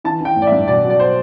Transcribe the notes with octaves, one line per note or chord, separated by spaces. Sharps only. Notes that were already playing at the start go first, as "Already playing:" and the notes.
E3 A5
E3 G5
A1
D5
E5
G2
B2 D5
F#3
D5
C5